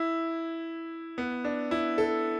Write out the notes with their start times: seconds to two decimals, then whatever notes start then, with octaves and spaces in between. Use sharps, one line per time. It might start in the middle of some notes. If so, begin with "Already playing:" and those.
Already playing: E4
1.18 B3
1.45 D4
1.71 E4
1.98 A4